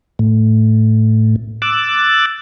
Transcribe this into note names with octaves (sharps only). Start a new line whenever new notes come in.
A2
D6 E6 F#6 A6